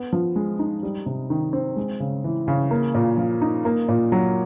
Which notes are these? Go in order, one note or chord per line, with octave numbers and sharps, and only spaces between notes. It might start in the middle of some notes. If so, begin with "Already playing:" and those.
Already playing: B3
F3
G#3
D#4
G3
C3
D#3
C4
G#3
C#3
E3
C#3
A#3
A#2
F3
D#4
A#3
A#2
F#3